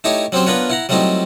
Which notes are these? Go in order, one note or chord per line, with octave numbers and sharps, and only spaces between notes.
A3 D#4 E4 G4 C#5
F#3 C4 C#4 G4 C5
B3 D4 F4 A#4 B4 C#5
E4 F#5 A#5
F#3 G3 A3 C4 D#4 E4